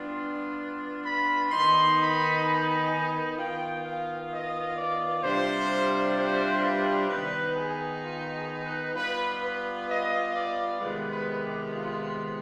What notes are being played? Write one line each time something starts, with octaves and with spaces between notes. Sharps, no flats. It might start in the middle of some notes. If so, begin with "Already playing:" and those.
Already playing: G3 B3 D4 F4
C6
B5
D#3 B3 D#4 C6
B5
G#5
D#3 B3 F4 G5
F5
D#5
D5
C3 G3 D4 F4 C5
C5
B4
D#3 B3 D#4 B4
G#4
F4
G#4
B4
G3 B3 F4 B4
B4
D#5
D5
C3 D#3 G#3 B3 B4
B4
G4
F4